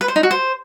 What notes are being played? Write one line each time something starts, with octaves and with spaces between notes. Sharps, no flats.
B4
C5
D#4
F#4
C5